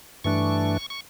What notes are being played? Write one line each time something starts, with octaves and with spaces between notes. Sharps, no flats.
G2 E3 A3 D4 C#6
C#6